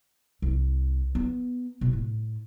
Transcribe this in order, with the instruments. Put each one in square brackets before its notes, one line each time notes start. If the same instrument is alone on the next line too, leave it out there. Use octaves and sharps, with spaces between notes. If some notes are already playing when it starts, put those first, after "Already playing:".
[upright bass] C2
B3
B2
A2